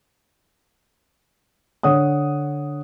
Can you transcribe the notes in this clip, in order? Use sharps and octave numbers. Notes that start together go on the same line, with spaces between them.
D3 C#5 F#5 D#6